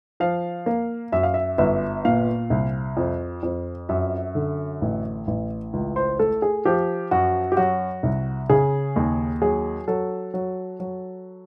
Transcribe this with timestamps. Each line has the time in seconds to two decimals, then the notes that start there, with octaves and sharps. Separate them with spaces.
0.20 F3 F5
0.66 A#3
1.12 F#2 E5
1.23 F5
1.34 E5
1.58 G1 E5
2.05 A#2 F5
2.50 C2
2.97 F2
3.43 F2
3.89 F#2 E5
4.35 D3
4.82 A1
5.27 A1
5.73 C#2
5.96 C5
6.19 A3 A4
6.42 G#4
6.65 F3 G4
7.11 F#2 F#4
7.52 G4
7.57 F#3 F#4
8.03 C2
8.49 C#3 G#4
8.96 D#2
9.42 F#3 G#4
9.88 F#3 A4
10.34 F#3
10.80 F#3